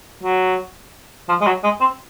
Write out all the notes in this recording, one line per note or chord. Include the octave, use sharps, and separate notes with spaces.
F#3
F3
G#3
F#3
G#3
C4